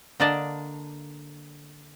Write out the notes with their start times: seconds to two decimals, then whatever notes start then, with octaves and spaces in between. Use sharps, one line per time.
0.20 D3 A#3 D4 D5 D#5 A5